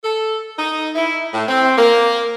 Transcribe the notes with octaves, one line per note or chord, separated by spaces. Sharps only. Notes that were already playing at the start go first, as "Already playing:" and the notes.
A4
D#4
E4
A2
C4
A#3